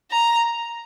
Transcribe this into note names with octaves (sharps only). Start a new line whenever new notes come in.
A#5